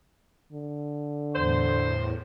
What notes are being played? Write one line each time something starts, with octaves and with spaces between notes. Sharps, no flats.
D3
E2 A2 C5